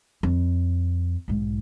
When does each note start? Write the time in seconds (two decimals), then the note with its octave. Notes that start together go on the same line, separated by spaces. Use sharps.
0.23 F2
1.28 B1 G#2